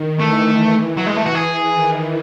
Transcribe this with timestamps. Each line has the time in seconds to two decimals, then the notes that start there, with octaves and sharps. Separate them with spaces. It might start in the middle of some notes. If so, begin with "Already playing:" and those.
Already playing: D#3
0.20 E3 A3
0.97 F#3
1.07 G#3
1.16 A3
1.26 F#4
1.35 E3 G#4
1.73 D#3